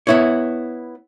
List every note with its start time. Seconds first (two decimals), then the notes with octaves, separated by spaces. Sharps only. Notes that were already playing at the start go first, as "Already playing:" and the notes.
0.07 B3 E4 C#5